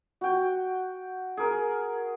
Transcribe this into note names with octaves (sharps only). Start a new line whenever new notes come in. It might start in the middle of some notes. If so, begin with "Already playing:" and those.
F#4 G5
G#4 A#4